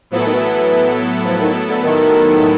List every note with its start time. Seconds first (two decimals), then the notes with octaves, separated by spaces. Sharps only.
0.10 A2 F3 F#3 B3 E4 A4
0.18 E3
0.26 D#3
0.34 E3
1.26 F3
1.41 D#3
1.69 D3
1.84 D#3